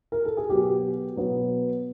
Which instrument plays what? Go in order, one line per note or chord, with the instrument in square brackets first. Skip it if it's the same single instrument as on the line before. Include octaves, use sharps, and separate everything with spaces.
[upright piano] A#4
A4
G#4
B2 F#3 B3 G4
B2 F#3 B3